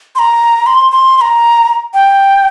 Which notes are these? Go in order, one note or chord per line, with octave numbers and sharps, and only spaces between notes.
C6
A#5
C6
C6
C6
A#5
G5